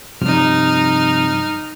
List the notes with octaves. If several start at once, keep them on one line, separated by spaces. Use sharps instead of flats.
G2 C3 F3 D#4 F6